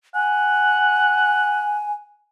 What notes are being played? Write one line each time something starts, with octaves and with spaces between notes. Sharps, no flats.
F#5 G#5